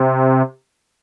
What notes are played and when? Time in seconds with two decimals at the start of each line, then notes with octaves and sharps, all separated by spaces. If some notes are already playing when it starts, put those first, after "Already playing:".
Already playing: C3